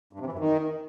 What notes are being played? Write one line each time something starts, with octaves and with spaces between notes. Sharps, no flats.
G2
C3
E3
F#2
D#3